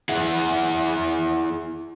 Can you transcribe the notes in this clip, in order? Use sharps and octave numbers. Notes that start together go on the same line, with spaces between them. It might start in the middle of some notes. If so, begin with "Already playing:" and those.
E4 G#4 E5 F#5